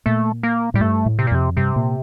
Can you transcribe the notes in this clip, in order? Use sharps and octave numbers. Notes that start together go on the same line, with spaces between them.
A#2 A3
A#3
A2 G3
G2 A3
A2
C3
A#2
F2 C3
G2 C3
A#2